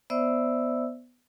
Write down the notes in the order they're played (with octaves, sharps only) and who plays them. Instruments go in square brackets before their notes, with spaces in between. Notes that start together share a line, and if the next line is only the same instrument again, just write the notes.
[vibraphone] B3 C5 D5 E5 E6